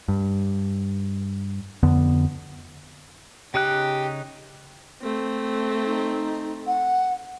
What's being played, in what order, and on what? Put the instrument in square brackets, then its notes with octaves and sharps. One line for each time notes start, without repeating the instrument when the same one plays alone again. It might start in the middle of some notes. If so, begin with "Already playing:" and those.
[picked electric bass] G2
F2 D3 B3
[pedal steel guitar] C#3 D#4 F#6 [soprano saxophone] G4
[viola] A3 C4
[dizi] D#4
F#5